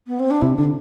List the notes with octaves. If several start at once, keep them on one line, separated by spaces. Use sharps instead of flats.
B3
C4
D4
C3 E4
D3 D4